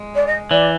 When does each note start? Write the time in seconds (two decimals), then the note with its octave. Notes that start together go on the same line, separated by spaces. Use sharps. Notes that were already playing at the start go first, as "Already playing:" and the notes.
Already playing: G#3
0.15 D5
0.27 D#5
0.51 E3 D5